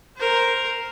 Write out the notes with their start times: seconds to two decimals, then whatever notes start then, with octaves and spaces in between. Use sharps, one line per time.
0.17 A#4 C5